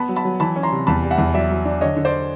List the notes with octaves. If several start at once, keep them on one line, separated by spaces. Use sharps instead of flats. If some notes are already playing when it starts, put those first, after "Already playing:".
Already playing: B3 A5 B5
F#3
A5 B5
F#3
E3 A5 B5
C#4
A#5 C6
C3
E2 A5 B5
G3
E5 F#5
E2
F#3 D5 E5
F#3
D4
D3 C#5 D#5
D3
C5 D5